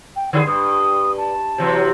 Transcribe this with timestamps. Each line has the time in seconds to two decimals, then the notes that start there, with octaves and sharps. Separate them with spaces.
0.16 G5
0.33 D3 G#4 D5
0.47 G2 D#6
1.17 A5
1.58 C3 E3 F#3